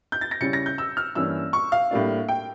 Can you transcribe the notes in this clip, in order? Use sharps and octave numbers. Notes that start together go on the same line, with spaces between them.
G6
A6
A#6
C#3 G3 C#4 E4 C#7
A#6
G6
E6
F6
G2 E3 A#3 C#4 E6
C#6
F5
A2 G3 A#3 D4
G5